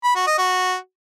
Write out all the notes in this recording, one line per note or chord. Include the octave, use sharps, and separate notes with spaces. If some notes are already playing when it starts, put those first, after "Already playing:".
B5
F#4
D#5
F#4